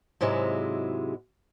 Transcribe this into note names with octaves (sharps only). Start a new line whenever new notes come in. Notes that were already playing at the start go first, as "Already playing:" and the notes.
G#2 C3 F#3 G#3 E4